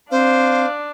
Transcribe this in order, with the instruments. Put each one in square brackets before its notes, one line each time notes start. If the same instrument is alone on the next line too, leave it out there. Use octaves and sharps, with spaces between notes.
[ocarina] C4 [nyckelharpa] D4 [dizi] C5 [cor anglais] F5